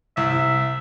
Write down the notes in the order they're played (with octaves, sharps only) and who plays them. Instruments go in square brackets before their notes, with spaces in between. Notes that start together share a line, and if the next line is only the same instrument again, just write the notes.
[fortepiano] C2 [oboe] E5